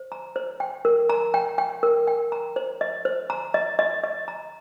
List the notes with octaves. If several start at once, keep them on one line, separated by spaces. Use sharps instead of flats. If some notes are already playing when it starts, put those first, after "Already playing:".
Already playing: C5
A#5
C5
G5
A#4
A#5
G5
G5
A#4
G5
A#5
C5
D#5
C5
A#5
D#5
D#5
D#5
A#5